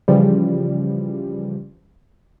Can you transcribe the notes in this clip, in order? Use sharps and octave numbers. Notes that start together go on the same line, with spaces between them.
C#3 E3 F3 G3